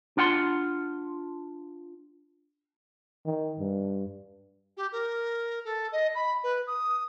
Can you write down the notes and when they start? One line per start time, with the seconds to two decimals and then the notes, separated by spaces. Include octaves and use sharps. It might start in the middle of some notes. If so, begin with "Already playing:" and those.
0.17 D4 F4 F#5 G5 C6
3.26 D#3
3.60 G2
4.77 G4
4.92 A#4
5.65 A4
5.92 D#5
6.15 B5
6.44 B4
6.67 D#6